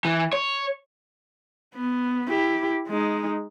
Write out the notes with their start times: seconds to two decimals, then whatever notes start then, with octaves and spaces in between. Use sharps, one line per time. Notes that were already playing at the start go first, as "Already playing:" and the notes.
0.05 E3
0.33 C#5
1.75 B3
2.28 E4 G4
2.88 G#3 D#4